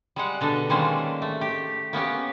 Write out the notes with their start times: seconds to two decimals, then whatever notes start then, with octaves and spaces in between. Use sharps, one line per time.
0.16 G3 G#3 F#5
0.41 B2 D3 D4 A4
0.69 D#3 G3 G#3 A#3 C#4 C5
1.22 A3
1.41 G4
1.93 A#3 B3 C#4 G4